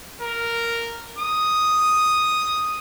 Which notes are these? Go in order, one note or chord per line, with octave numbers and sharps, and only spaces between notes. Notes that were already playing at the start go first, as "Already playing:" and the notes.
A#4
D#6